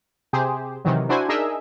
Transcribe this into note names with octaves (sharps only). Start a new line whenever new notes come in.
C3 G4 G#4 C5
C3 D#3 E3 F#3
D4 E4 F#4 C5 G#5
D4 D#4 G#4 A#4 D#5 E5